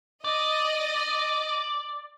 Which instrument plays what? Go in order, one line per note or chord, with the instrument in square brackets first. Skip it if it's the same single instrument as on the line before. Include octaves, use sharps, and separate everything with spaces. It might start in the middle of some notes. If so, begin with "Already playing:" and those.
[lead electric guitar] D5 [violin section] D#5